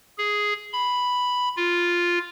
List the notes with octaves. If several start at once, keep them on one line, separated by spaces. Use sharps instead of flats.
G#4
B5
F4